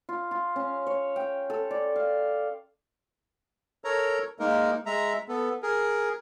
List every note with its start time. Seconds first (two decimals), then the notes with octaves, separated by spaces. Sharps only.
0.09 F4
0.31 F4
0.56 C#4
0.87 C#5
1.16 G5
1.50 A4
1.71 D5
1.96 F5
3.84 A4 A#4 C#5 A#5
4.39 G#3 A#3 D#4 A#4
4.86 G#3 E5 A#5
5.28 B3 A4
5.63 G#4 A#4